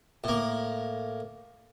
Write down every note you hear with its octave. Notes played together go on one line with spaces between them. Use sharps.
A2 A#3